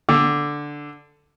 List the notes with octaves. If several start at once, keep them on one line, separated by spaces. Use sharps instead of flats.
D3